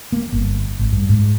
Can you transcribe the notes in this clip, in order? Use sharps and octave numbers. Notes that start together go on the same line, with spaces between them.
A#3
G1
G#1
G2
G#2